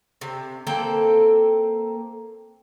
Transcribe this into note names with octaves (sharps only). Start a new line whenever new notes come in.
C3
A#3 C4 A4 G5